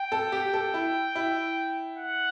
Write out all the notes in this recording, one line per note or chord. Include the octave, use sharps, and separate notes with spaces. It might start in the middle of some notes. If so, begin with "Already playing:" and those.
Already playing: G5
A4
G4
A4
E4
E4
F#5